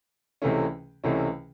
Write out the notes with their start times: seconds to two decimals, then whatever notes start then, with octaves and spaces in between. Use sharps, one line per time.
0.42 C#2 C3 E3 A3 C#4
1.04 C#2 C3 E3 A3 C#4